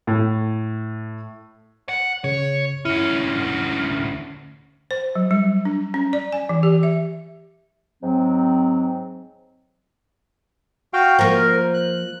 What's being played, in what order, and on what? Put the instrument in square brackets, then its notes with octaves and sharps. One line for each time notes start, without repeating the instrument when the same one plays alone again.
[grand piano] A2
[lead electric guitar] F#5
[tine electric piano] C#3 [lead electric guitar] C#5
[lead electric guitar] D2 C#4 [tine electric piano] E4
[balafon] C5
F#3
G3
D4
C#4
D5
G#5
E3
G4
E5
[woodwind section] G#2 F#3 C4
[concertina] F#4 F5 G5
[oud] F3 A#3 [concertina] A#4
[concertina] F#6